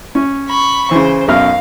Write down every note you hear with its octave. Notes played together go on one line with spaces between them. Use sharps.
C#4
B5 C#6
C#3 E3 C5
B1 F#2 F5 F6